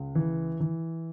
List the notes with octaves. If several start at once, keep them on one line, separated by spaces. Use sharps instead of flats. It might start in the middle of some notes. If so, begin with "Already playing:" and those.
Already playing: C#2
E3
E3